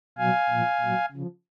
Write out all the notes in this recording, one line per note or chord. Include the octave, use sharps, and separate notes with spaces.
B2 F#3 F5 G#5
A#2 F3
A#2 F#3
C#3 F3